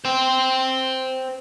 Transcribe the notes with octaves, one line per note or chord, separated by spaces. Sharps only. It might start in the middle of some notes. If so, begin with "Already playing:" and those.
C5 G5